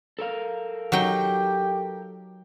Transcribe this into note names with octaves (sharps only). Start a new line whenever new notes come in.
A4 A#4 F5
F#3 D#4 G4 G5